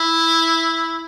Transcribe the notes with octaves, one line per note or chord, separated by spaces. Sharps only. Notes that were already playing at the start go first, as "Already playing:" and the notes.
Already playing: E4